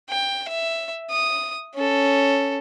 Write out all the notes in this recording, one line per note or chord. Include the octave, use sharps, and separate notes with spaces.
G5
E5
D#6
C#4 A4